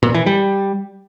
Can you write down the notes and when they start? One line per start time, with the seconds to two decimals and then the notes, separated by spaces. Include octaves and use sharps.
0.03 A#2
0.14 E3
0.26 G3